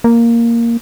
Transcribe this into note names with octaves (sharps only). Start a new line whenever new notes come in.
A#3